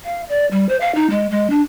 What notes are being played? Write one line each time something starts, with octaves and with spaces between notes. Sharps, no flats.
F5
D5
G3
C5
F5
D#4
G#3
G#3
D4